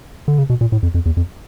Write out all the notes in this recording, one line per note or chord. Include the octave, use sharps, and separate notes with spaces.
D3
C#3
B2
A#2
A2
F2
F2
E2
F2